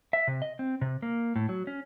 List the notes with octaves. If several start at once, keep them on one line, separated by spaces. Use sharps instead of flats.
E5
C3
D#5
C4
C3
A#3
A2
F#3
C#4